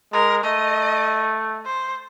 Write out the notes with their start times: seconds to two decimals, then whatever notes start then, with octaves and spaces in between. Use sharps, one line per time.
0.13 G#3 A#4
0.44 A3 D#5
1.66 C5